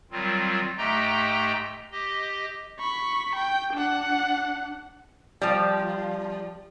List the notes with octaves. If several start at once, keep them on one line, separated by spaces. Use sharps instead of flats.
D#3 F#3 G3 C4 F4
G#2 A3 G4 D#5 G5 A#5
G4 D#5
B5 C#6
G5
D4 F#5
F3 G3